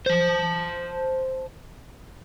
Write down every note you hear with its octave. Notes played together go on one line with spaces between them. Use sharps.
C5 A5